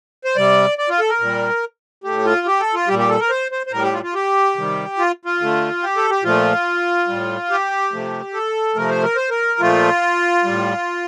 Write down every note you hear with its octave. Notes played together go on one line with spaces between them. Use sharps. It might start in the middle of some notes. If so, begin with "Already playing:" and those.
C5
C3 G3 D5
D5
F4
A4
A#4
A#2 G3
A2 A3 G4
F4
G4
A4
F4
A#2 G3 G4
G4
A4
A#4
C5
C5
C5
A2 G3 A#4
G4
F4
F4
G4
C3 D#3 G3
F4
F4
D3 A3
G4
A4
G4
A#2 F3 A3 F4
A2 G3
G4
C3 F3 A3
A4
C3 F3 A3 A#4
C5
A#4
C5
A#4
A#2 F3 A3 F4
A2 G3